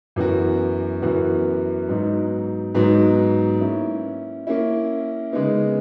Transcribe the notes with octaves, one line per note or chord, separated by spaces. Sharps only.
F#2 E3 B3 F#4
F#2 E3 B3 F#4
G#2 F#3 B3 D#4
G#2 F#3 B3 D#4
A#3 C#4 E4
A#3 C#4 E4
C#3 G#3 B3 D#4